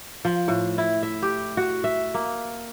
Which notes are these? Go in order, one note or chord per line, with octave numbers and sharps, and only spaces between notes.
F3
A2
E4
E5
G4
F#4
E5
A#3